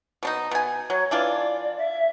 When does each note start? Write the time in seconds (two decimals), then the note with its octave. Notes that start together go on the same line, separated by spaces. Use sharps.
0.23 B2 D4 D#4
0.51 B2 G#5
0.90 F#3 C#5
1.11 E3 D4 F4 D5
1.78 E5